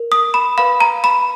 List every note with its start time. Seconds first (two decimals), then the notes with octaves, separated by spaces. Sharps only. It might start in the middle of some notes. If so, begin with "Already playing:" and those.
Already playing: A#4
0.12 D#6
0.34 B5
0.58 B4 F5 B5
0.80 A#5
1.04 B5